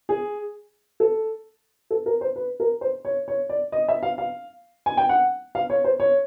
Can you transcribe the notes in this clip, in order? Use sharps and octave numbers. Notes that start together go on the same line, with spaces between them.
G#4
A4
A4
A#4
C5
B4
A#4
C5
C#5
C#5
D5
D#5
E5
F5
F5
G#5
G5
F#5
F5
C#5
C5
C#5